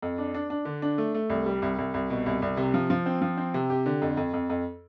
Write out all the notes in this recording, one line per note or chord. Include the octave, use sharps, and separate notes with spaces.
F2
D4
D4
D4
D3
D4
A3
A3
C2
G3
C2
C2
C2
B2
C2
C2
C3
F3
F3
C4
F3
C4
C3
G4
D3
F2
F2
F2
F2